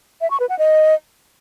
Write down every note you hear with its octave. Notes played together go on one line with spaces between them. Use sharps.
E5
C#6
B4
F#5
D#5